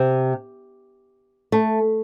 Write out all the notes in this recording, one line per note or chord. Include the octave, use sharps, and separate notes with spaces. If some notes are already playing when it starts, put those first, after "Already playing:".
Already playing: C3
A3